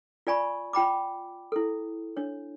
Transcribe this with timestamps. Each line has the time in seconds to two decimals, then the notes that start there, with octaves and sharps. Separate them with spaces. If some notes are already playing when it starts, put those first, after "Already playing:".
0.27 F4 D5 G#5 B5 C#6
0.73 F4 G5 B5 D6
1.52 E4 A4
2.17 D4 C#5